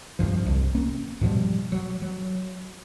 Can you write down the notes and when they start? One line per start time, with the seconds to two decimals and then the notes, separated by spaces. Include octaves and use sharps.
0.19 G#1 C#2 G2 F3
0.46 C2
0.75 A#3 C#4
1.21 G#2 B2 F3 G3
1.72 F#3
2.02 F#3